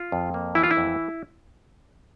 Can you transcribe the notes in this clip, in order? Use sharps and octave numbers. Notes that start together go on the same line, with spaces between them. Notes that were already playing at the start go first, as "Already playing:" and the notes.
Already playing: F4
F2
A#3
E3 E4
F4
E4
F2